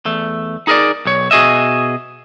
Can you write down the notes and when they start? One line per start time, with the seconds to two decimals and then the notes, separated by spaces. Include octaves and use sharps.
0.05 E2 A3
0.67 D#4 G#4 A#4 B4 D5
1.05 B1 C#5
1.31 B2 F#4 G#4 D#5 E5